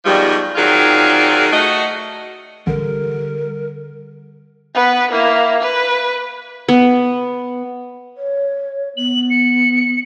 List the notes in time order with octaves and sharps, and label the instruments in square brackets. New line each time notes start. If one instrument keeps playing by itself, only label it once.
[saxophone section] G#2 B2 D#3 F3 G3
D#3 F#3 C4 F4 G#4 D5
A3 F#4 D#5
[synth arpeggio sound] A1 [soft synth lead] D3 [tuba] G3 [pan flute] A#4
[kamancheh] B3 B4
A#3 E4
B4
[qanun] B3
[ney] C#5
[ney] B3 [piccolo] F#7
[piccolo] C#7